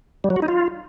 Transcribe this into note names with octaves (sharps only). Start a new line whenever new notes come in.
G3
F#3
F#4
D#4
F4